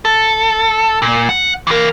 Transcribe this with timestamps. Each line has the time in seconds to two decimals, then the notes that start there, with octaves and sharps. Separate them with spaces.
0.05 A4
1.02 A#2
1.29 F#5
1.67 E3 A#4